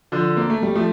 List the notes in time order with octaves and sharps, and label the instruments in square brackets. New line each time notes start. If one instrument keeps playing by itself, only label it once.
[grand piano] D3 F3
A#3
A3
G3
F3 A3